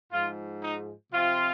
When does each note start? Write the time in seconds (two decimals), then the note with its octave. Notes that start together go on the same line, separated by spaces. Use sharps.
0.12 G#2 F3 G#3 F4
0.62 D#4
1.13 C3 F3 C4 F4